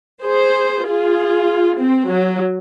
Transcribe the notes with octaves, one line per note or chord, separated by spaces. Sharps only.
G#4 C5
F4 G#4
C4
F#3